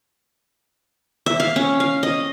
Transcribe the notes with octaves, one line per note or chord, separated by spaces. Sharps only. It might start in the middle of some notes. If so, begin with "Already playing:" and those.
E5
F5
C#4
F5
D#5